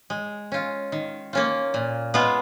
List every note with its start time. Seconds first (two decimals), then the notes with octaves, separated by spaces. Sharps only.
0.10 G#3
0.52 C#4 F4
0.92 D#3
1.33 A#3 C#4 F4
1.74 A#2
2.14 G#3 B3 F4